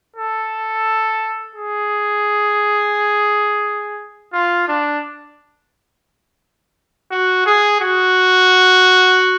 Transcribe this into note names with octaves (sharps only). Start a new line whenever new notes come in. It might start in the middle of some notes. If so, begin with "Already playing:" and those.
A4
G#4
F4
D4
F#4
G#4
F#4